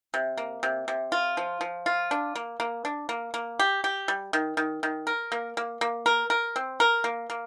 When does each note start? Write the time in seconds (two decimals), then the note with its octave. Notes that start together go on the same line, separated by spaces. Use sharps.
0.14 C3
0.38 A#3
0.63 C3
0.88 C3
1.12 F4
1.37 F3
1.61 F3
1.86 F4
2.11 D4
2.35 A#3
2.60 A#3
2.85 D4
3.09 A#3
3.34 A#3
3.59 G4
3.84 G4
4.08 G3
4.33 D#3
4.57 D#3
4.83 D#3
5.07 A#4
5.32 A#3
5.57 A#3
5.81 A#3
6.06 A#4
6.30 A#4
6.56 C4
6.80 A#4
7.04 A#3
7.30 A#3